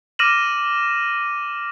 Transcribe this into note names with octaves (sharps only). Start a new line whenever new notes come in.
D6 F6 A#6 D#7 E7 F#7